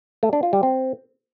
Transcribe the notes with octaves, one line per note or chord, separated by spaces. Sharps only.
A3
D4
F4
G3
C4